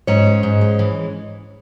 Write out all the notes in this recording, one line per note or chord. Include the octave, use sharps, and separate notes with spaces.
G#2 C#4 C#5
G#3
G#2
G#3
E3